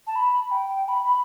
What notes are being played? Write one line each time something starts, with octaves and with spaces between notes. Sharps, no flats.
A5
B5
G5
B5